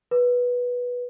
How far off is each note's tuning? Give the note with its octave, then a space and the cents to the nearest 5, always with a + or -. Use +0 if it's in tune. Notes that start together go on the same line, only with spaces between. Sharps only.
B4 -10